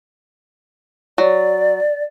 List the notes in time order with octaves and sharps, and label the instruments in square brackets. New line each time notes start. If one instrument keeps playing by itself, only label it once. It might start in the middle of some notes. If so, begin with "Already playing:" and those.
[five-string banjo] F#3 [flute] D5